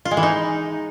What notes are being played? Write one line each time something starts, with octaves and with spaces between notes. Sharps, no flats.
F4
G#3
E3
D#4